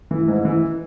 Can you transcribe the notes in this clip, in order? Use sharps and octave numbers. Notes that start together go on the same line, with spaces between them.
E3
G#2
E3